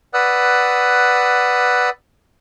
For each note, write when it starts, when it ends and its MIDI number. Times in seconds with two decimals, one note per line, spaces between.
0.14 1.90 71
0.14 1.90 74
0.14 1.90 78
0.14 1.90 87
0.14 1.90 88
0.14 1.90 90